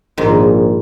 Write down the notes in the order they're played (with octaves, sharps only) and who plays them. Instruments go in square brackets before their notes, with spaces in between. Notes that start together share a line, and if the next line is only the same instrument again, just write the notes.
[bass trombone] A#1 [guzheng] G#2 D#3